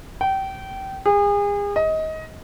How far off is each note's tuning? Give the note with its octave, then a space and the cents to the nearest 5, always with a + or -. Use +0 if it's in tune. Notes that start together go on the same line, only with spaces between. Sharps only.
G5 -25
G#4 -35
D#5 +20